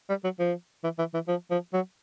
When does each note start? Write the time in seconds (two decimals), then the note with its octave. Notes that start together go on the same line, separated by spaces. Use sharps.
0.09 G3
0.24 F#3
0.39 F3
0.84 E3
0.99 E3
1.14 E3
1.28 F3
1.51 F3
1.73 F#3